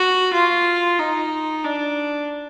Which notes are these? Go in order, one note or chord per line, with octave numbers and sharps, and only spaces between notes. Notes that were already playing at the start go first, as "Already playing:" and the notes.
Already playing: F#4
F4
D#4
D4